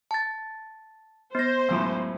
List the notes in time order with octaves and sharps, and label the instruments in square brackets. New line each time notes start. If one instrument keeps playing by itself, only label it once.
[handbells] A5 A6
[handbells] B3 A#6 [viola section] C5
[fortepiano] C#2 F#2 A2